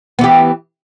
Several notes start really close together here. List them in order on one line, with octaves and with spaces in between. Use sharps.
B3 E3 G4